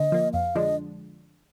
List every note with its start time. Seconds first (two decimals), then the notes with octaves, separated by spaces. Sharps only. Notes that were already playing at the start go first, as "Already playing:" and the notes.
Already playing: D3 A#3 D#5
0.12 F3 A#3
0.33 F2 F5
0.55 D3 F3 G#3 D4 D#5